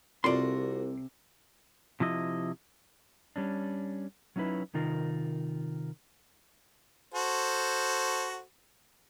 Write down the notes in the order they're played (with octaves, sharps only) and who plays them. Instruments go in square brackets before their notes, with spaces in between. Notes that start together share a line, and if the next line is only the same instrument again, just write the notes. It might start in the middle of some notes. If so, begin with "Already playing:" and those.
[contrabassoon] C2 [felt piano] C3 A4 [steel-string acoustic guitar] F4 F#4 A#4 [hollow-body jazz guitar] D5 C6
[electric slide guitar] C3 F3 E4 D#5
G3 C#4 D4
F#3 C#4 D#4 E4 B4
C3 D#3 D#4 F4 A#4
[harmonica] F#4 A4 C5